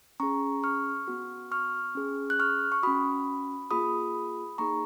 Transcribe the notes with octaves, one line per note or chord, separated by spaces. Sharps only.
C#4 G#4 A#5 C#6
C#6 F6
B3 F#4
C#6 F6
C#4 G#4
F#6
C#6 F6
C#6
C#4 F#4 B5 D#6
A#3 F4 G#4 B5 D#6
A#3 D#4 G#4 A#5 C#6